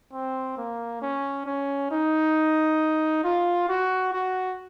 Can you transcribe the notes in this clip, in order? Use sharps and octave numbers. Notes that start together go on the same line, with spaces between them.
C4
A#3
C#4
C#4
D#4
F4
F#4
F#4